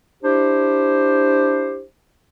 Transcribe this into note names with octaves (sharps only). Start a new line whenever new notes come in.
D4 E4 G4 C5